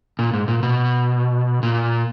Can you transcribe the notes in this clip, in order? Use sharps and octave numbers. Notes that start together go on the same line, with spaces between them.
A#2
G#2
A#2
B2
A#2